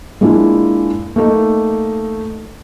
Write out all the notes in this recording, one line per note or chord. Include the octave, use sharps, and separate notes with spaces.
G#3 A#3 D4 E4 F4
A3 A#3 D#4 A4